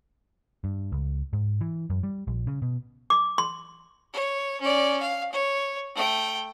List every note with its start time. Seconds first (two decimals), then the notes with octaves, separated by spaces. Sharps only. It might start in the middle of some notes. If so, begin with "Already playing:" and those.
0.64 G2
0.92 C#2
1.33 G#2
1.61 E3
1.90 F#2
2.03 G3
2.27 A#1
2.47 C#3
2.62 B2
3.10 D6
3.38 C6
4.13 C#5
4.61 C#4 D5
5.01 F5
5.32 C#5
5.95 A3 G5